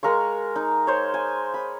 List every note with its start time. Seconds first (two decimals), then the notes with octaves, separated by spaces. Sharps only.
0.03 G#3 A#4 F5 C#6
0.56 D#4
0.87 C5 C#5
1.14 G#5
1.54 B5